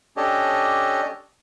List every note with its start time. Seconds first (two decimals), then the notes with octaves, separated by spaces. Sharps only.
0.17 C#4 D4 G4 A4 C#5 D#5